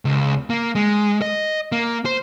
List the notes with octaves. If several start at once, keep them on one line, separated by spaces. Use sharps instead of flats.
C#2
A#3
G#3
D#5
A#3
C5